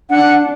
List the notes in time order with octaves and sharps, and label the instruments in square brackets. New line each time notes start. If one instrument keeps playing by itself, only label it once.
[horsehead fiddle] D4 [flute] F#5